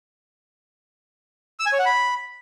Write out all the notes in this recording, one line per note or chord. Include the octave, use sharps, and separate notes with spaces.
E6
G#5
C#5
F#5
B5